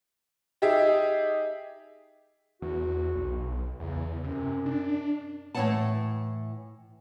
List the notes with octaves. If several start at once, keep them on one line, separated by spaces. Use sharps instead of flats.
D#4 G4 G#4 E5
E2 F#4
B1
E2 C#3
F#2 C3
D4
A2 E3 C4 C#5 F#5 A5